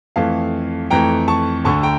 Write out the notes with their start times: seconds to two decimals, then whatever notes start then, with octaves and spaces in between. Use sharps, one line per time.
0.16 F2 E3 A3 F5 A5
0.90 F2 E3 A3 G5 A#5
1.28 A5 C#6
1.65 D2 D3 A3 A5 C#6
1.83 G5 A#5